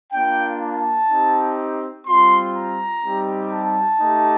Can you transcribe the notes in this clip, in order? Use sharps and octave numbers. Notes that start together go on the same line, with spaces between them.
A#3 D4 F4 G5
A5
C4 D#4 G4
G3 C4 F4 C6
A#5
G3 C4 D#4 G4
A5
A3 D#4 G4